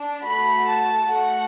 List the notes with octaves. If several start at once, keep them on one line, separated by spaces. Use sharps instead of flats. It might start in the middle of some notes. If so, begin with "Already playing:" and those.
Already playing: D4
A3 F#4 A4 B5
A5
A3 F#4 A4 F#5